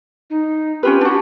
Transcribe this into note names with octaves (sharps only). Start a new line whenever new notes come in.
D#4
C#4 F4 G4 B4
D4 F#4